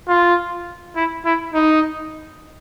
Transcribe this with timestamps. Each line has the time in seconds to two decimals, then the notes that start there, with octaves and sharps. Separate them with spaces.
0.08 F4
0.96 E4
1.25 E4
1.54 D#4